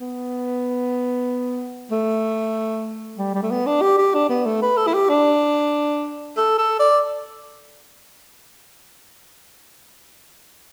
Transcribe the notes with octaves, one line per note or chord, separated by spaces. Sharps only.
B3
A3
G3
G3
A3
B3
D4
G4
G4
D4
B3
A3
B4
A4
E4
G4
D4
A4
A4
D5